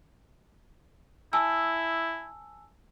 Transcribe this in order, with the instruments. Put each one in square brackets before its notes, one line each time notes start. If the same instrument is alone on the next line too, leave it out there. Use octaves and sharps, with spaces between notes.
[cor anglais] E4 [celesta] G#5 A5 E6